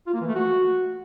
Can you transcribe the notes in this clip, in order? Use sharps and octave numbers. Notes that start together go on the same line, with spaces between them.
F4
A#3
E3
A3
F#4